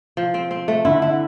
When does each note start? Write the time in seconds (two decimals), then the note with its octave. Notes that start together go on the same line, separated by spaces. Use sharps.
0.17 F3
0.34 C4
0.51 C4
0.68 A3
0.85 D3 E4
1.02 E4